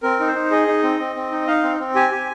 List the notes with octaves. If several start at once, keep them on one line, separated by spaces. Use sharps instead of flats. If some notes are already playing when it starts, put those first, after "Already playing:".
C4 A#4
D#4
C5
D#4
G#4 D#5
D#4
C4
C4
C4
D#4
D#4 F5
C4
C4
G4 G#5
G4